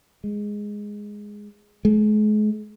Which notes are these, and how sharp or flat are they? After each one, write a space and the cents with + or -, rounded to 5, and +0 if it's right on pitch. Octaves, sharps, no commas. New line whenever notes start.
G#3 -5
G#3 +40